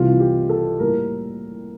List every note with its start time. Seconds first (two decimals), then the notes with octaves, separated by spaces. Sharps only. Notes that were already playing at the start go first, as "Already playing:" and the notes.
Already playing: C2 C3 E3 G3 F4
0.20 G4
0.49 A4
0.79 A2 G3 A#3 A#4